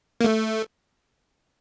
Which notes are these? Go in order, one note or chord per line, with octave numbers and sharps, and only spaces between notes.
A#3
A3